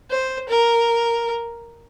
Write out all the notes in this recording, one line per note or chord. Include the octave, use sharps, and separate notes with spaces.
C5
A#4